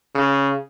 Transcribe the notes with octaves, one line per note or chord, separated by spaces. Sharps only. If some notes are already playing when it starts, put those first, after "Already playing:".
C#3